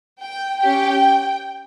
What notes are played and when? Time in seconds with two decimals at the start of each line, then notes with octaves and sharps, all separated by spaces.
0.22 G5
0.62 C#4 G4 G5